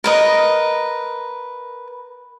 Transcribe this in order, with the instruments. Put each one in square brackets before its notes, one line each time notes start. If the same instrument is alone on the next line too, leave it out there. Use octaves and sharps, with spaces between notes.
[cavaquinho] A#4 B4 D#5